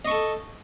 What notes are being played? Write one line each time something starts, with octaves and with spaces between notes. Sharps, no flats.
A4 D#5 C#6